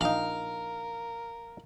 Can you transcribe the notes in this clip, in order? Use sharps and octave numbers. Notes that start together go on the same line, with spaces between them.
A#1 D#4 A#4 F5